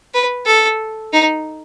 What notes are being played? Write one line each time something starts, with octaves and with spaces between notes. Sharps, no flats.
B4
A4
D#4